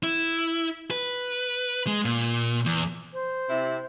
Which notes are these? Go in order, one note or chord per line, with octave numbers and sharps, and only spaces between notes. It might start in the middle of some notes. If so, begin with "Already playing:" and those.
E4
B4
G#3
A#2
E2
C5
C3 E4